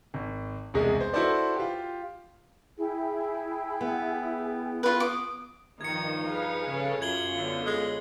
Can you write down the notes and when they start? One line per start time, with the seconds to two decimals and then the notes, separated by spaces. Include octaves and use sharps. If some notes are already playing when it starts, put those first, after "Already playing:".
0.14 G#1
0.74 E1 C2 G#3 G#4
1.01 C5
1.13 E4 F#4 A4 B4 C5 D5
1.56 F4 G4
2.78 E4 G#4 G5
3.81 B3
4.83 F4 B4
5.00 D6 D#6
5.81 G2 D#3 F3 D#4 G#6 C#7
6.25 G#4 B4 F5
6.69 C#3 C#4 A4
7.02 F#2 F4 G#6 F#7 G7
7.35 D3 B3 C#4
7.66 G#3